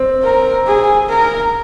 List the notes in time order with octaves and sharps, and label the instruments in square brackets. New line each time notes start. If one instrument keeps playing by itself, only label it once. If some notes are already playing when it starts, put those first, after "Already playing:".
Already playing: [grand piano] C4
[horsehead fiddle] A#4
G#4
A#4